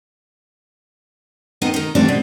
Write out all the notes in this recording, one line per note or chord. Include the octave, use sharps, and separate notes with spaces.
D#3 B3 C4 D#4
D#3 D#4
D#3 E3 G3 A3 C4 D4
B2